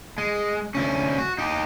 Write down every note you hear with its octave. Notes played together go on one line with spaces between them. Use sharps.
G#3
D2 C#4
F#4
D#4 G4